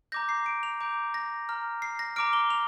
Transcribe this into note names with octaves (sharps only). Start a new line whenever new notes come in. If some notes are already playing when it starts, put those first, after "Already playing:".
A#5 D6 G6 A#6
C7
D7
F7
A#5 D6 G6 D7
A#6
A#5 F6
C7
A#6
A#5 D6 F6 D7
G7
F7